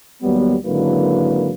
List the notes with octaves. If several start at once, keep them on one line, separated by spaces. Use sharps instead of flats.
D#2 F#3 G3 B3
G#1 D3 F#3 A#3 E4 B4